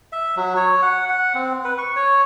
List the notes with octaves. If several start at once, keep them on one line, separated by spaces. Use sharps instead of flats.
E5
F#3
C#5
F#5
F#5
C4
B4
C#6
C#5